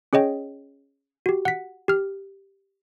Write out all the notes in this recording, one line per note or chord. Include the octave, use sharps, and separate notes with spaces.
C#4 G#4 C#5 D#5 G5
F#4 G4
F#5 B6
G4 F6